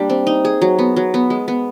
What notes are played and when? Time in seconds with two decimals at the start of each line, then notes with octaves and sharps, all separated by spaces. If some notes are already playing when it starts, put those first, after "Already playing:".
Already playing: G3 A#3 D4
0.10 C4
0.27 D#4
0.45 G#4
0.62 F#3
0.78 B3
0.96 F#3
1.14 B3
1.30 G#3
1.48 B3